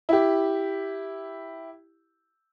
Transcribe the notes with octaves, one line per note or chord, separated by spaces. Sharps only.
E4 G4